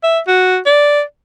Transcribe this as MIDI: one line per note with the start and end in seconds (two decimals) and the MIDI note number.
0.03 0.19 76
0.27 0.58 66
0.66 1.01 74